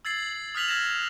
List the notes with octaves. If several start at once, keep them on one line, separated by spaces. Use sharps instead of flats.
E6 G#6 A6 C7 F#7
D#6 F6 F#6 B6 F7 F#7
F6 G6 G#6 A#6 B6 E7